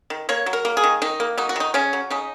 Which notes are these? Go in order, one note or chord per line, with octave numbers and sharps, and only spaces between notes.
D#3
A#3 C#5
F#3
A#4
A#3
G#4
D#3
D#3 D#4
A#3
F#3 D#4
F#4
D#3 D#4
C#3 C#4
F#3
C#3 D#4